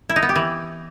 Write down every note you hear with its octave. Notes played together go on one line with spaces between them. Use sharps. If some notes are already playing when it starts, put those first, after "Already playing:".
E4
D#4
B3
G4
E3